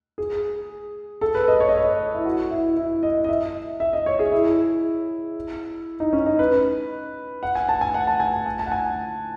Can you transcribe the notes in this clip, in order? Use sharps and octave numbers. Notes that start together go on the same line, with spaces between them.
G#4
A4
B4
D#5
C#5
D#5
C#5
E4
F#4
E4
E4
D#5
D#5
E5
E5
D#5
C#5
G#4
E4
D#4
C#4
D#4
B4
F#5
G#5
A5
G#5
F#5
A5
G#5
G#5
A5
F#5
G#5